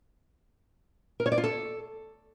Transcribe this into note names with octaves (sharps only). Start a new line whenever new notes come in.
A#4
C#5
D5
F4
A4